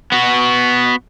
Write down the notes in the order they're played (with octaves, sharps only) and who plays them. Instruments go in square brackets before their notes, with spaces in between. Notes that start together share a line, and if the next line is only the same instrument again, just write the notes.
[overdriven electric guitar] B3 F#4